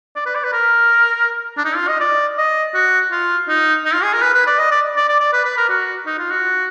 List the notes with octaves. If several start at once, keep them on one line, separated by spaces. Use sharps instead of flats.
D5
B4
D5
B4
A#4
D4
D#4
F4
D#5
D5
D#5
F#4
F4
D#4
D#4
F4
G#4
A#4
B4
B4
D5
D#5
D5
D5
D5
D5
B4
B4
A#4
F#4
D#4
F4
F#4